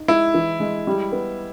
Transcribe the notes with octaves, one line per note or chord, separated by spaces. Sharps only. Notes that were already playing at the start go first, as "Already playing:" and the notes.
Already playing: D#4
G#3 E4
E3
G#3
G3
B3